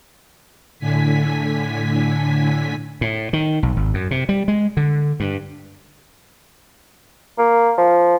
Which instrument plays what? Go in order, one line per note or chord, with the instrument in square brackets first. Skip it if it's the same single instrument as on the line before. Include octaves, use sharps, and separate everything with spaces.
[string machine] A2 D3 G#5 B6
[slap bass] A2
D#3
B1
G#1
F#2
C3
G3
G#3
D3
G2
[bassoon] A#3
F3